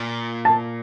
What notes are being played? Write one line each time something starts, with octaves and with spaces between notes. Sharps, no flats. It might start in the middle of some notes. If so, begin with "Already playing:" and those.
Already playing: A#2
A5